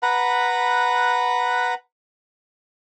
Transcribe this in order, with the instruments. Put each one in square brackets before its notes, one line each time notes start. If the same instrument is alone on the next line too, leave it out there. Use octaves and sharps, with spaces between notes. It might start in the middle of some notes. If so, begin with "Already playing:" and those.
[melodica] B4 F#5 A#5 B5